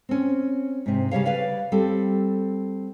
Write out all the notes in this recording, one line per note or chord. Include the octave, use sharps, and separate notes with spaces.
C4 C#4
G#2 C3
C#3 G3 C#5 F5
B4 C#5 D5 F5
G3 C4 A4